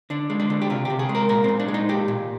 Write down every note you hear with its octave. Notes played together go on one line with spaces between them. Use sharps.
D3 D4
G#3
D4
D3
G4
C3 F4
C3 G4
G#4
G#3
A#4
A#2 A#4
A#2 C4
D4
G#3
D#4
A#2 G4
A#2